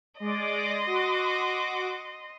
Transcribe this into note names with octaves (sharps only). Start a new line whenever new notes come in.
G#3 D5 D#5 C6 D6
F#4 D6